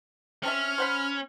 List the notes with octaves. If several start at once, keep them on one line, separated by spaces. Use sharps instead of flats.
C4 C#4 A4 E5 F6
C5 F#5 B5